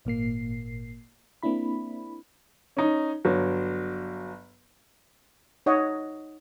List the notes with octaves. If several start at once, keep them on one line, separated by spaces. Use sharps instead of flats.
G#1 A#2 A#3 C7
A#3 C4 D4 E4 B5
C#4 D#4
G1 F#3
D#4 C#5 D#5 F#5